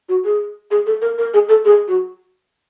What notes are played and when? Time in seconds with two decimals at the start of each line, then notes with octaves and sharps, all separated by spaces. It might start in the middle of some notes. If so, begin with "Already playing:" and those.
0.09 F#4
0.25 G#4
0.71 G#4
0.86 A4
1.02 A#4
1.18 A#4
1.34 G#4
1.49 A4
1.65 G#4
1.88 F#4